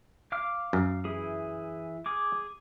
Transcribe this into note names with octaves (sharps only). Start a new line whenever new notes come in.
F5 D6 F6
F#2
E3 E4 G#4
G#4 D6